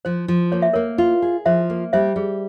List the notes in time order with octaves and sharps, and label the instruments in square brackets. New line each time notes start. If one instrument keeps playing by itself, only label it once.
[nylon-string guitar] F3 [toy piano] C5
[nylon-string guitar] F3
[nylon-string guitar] A#3 [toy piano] C#5
[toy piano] E5
[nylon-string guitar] A#3 [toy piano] A#4 C#5
[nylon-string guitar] F4
G#4
[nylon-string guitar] F3 [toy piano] C5 E5
[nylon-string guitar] A#3
[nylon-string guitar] G3 [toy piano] C5 E5
[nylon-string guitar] G3 [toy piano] G#4